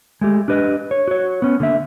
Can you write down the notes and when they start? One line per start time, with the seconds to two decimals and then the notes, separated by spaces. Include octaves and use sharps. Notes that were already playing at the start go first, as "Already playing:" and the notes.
0.21 G#3 A3 G4
0.48 D4 G4 B4 D#5
0.91 C#5
1.08 F#4 C#5
1.42 B3 C#4
1.60 D3 A#3 E5